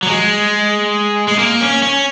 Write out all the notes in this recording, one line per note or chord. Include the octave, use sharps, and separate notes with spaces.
F#3
G#3
G#3
A#3
C#4
C#4